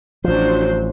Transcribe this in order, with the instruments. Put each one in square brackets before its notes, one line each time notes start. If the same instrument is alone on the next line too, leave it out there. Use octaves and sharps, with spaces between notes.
[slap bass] A1 F3 [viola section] F#3 D4 C5